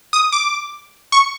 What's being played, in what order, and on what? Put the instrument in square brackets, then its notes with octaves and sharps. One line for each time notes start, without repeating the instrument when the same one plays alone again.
[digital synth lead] D#6
D6
C#6